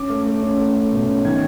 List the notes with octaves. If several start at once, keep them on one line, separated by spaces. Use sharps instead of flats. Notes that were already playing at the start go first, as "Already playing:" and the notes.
Already playing: C#4 D6
A3
A3
C#4
A3
A3
B2
C#4
D#3 G#6